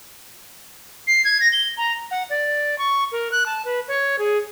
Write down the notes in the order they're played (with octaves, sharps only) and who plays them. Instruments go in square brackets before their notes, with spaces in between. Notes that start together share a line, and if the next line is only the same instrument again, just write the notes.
[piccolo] C7
G#6
A#6
G7
A#5
[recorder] F#5
D5
C#6
A#4
F#6
A5
B4
C#5
G#4